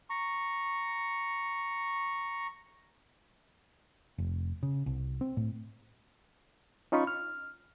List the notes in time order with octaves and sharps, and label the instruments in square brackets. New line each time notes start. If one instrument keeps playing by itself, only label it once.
[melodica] A#5 C#6
[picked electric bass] F1
C#3
C2
C4
A2
[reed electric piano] C#4 D#4 F4 B5 C#6
F6